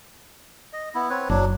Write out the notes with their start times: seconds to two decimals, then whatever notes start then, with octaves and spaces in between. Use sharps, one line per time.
0.73 D#5
0.95 B3 E4
1.10 C4 B4 C#5
1.29 F#1 F#3 D4